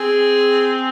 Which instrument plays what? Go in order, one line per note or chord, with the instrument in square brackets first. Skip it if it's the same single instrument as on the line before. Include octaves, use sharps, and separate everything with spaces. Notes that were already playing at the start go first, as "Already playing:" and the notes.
Already playing: [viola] C4 [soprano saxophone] G#4